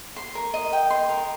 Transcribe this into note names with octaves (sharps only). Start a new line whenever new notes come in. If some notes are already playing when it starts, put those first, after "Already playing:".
C6
A#4
D#5
G5
C6
A#4